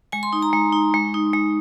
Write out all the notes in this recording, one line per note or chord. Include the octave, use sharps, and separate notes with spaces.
G#3 G#5
C6
D#4
A#5
G#3
D#4
G#3
D#4
G#3